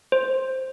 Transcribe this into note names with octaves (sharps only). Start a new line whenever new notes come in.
C5